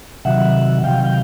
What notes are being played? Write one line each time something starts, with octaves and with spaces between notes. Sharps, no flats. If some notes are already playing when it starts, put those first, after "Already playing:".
C3 D#3 F#3 E5 F#5
C3 D#3 F#3 F5 G5
F5 G5